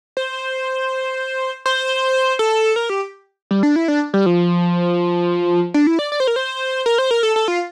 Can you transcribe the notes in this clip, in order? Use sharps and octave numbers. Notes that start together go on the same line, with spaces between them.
C5
C5
A4
A#4
G4
G3
D4
E4
D4
G3
F3
D4
E4
D5
D5
C5
A#4
C5
A#4
C5
A#4
A4
A4
F4